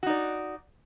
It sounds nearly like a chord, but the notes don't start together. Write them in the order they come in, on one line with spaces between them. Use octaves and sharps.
F#4 D#4 D5